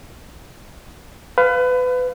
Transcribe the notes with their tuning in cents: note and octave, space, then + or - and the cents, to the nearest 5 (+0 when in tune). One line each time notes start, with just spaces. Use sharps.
B4 +25 F5 +0